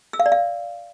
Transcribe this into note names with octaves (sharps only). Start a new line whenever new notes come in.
E6
F5
D5
F5